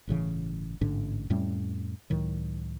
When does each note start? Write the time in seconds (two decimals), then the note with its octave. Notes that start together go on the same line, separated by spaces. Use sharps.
0.07 G1 A2 C#3 E3
0.81 A1 G#2 D3 D4
1.30 F2 A2 G3 C#4
2.10 C#2 A2 D#3 F#3